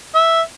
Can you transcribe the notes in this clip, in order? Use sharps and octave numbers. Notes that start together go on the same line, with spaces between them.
E5